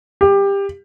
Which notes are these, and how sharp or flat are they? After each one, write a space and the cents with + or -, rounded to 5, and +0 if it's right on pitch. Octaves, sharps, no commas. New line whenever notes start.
G4 +20